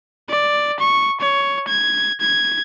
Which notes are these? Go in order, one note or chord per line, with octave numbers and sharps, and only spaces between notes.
D5
C#6
C#5
G#6
G#6